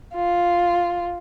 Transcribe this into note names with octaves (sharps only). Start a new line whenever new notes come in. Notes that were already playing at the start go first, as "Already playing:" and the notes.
F4